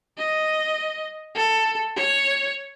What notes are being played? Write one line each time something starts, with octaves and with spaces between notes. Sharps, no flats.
D#5
A4
C#5